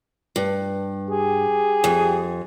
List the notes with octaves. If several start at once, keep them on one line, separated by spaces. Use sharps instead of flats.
G2
G4 G#4
F2